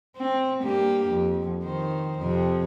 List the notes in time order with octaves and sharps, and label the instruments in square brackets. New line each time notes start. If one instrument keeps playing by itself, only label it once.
[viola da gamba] C4
G2 A#3 G4
F2
D#3 C5
F2 C3